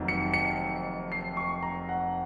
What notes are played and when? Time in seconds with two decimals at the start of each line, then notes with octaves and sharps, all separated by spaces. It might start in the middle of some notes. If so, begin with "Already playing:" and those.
Already playing: F1 F2 D#3 F#3 A#3
0.08 C#7
0.34 C#7
1.12 C7
1.37 C#6
1.63 A#5
1.89 F#5